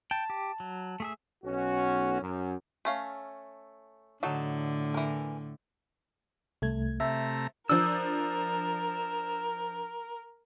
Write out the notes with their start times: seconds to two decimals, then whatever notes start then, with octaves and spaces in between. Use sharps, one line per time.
0.11 G5 A5
0.30 G4
0.60 F#3
1.00 A3 G#4 E5
1.44 B1 C#4 F#4
2.21 F#2
2.85 A3 C#4 F5
4.23 A2 D3 F#3 D#4 A4
4.94 E3 A#4
6.62 C2 A3 G#6
7.00 C3 A3 E5 A#5
7.69 F3 D4 A#4 E6